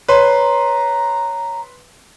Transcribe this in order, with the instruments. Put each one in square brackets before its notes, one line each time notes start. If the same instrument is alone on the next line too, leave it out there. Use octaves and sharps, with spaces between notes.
[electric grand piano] B4 C6 [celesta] C#5 [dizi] A#5